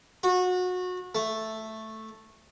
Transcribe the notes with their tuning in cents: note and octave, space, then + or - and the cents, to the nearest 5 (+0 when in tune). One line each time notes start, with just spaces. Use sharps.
F#4 -25
A3 +0